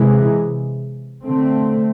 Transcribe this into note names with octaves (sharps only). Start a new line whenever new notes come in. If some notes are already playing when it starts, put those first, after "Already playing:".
Already playing: C3 E3 G#3
D3 A3 C4